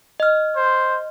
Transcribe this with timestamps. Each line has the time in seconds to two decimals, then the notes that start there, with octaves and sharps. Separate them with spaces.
0.20 D#5 F6
0.56 C5